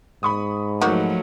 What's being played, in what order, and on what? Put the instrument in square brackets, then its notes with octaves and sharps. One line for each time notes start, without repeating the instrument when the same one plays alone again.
[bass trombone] G#2 [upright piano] B5 C#6 D#6
[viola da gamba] F3 F#3 A3 [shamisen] A#3 D#4 F#4